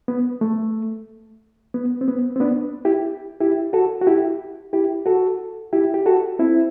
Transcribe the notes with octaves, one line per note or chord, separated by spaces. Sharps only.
B3
A3
B3
C4
B3
C4
B3 D4
E4 G4
E4 G4
F#4 A4
F#4
E4 G4
E4 G4
F#4 A4
E4 G4
G4
F#4 A4
C4 E4